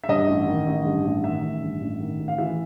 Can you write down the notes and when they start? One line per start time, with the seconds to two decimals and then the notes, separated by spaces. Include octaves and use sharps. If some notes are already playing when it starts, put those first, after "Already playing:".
0.04 E5
0.09 G2 D#5
0.28 A1
0.47 D#3
0.66 A1
0.85 G2
1.05 A1
1.24 D#3 E5
1.43 A1
1.62 G2
1.81 A1
2.00 D#3
2.19 A1
2.28 F5
2.38 E3 E5